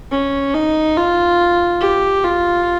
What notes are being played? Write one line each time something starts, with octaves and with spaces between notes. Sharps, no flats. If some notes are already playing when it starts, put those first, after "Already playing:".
C#4
D#4
F4
G4
F4